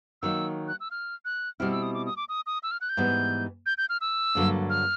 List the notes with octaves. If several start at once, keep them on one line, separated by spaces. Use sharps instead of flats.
D#3 F#3 A#3 D#4 E6
F#6
E6
F6
F#6
B2 G3 C4 E4 F6
E6
D#6
D6
D#6
D6
D#6
D#6
E6
F6
F#6
G6
G#2 E3 G3 B3
G6
G6
F6
E6
G2 D3 F#3 A#3 D4
F6